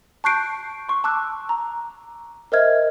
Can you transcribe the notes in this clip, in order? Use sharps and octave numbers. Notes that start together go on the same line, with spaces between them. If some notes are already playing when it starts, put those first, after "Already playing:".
A5 C#6 F#6 G6 C7 D7
C6 C#6
A5 D6 E6 F#6
A#5
A#4 C5 D#5 E5 F6 G#6